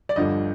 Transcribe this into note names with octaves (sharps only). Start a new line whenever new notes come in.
D5
G1 G2 D3 F3 D#5